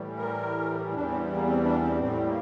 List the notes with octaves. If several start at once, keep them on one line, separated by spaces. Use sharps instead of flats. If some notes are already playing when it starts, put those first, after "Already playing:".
Already playing: A2 E3 G3
A#4
E2 E3 G3 D4
C4
A#3
C4
D4
C4
A2 G3 C4
A#3